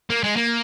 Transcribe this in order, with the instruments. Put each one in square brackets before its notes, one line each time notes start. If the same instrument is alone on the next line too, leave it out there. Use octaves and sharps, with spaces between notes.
[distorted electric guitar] A#3
G#3
A#3